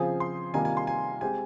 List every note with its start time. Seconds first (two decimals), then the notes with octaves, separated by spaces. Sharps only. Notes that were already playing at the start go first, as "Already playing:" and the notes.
Already playing: C#3 F3 C4 F4 G#4 G#5
0.20 C6
0.53 C3 D#3 G3 A#3 F4 G#5
0.65 G#5
0.77 C6
0.87 G#5
1.21 G#3 C4 G4 G#5